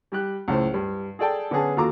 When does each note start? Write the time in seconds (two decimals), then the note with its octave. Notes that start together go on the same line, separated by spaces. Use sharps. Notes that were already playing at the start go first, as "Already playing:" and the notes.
0.12 G3 G4 F#6
0.48 C#2 A2 C5
0.74 G2
1.19 G#4 A4 D5 G5 A5
1.51 D3 B3 C#4 G#4 A5
1.77 D#2 F4 F#4 A4 A#5 D6